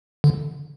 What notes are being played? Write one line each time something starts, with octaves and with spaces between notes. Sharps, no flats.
D3